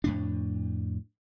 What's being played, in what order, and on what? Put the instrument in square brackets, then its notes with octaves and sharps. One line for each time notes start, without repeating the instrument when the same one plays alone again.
[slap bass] F2 A2 D4